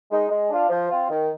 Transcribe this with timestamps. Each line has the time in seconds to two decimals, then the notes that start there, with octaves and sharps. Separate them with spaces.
0.10 G#3 D#4
0.29 G#3
0.50 D4 F4
0.69 F3
0.89 C4 F4
1.10 D#3